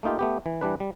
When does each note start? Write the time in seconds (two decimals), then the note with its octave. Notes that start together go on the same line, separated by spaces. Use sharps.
0.03 A3 A#3 D#4 F4 G4
0.19 A3 B3 G4
0.46 E3
0.61 E3 G3 D4 B4
0.80 G3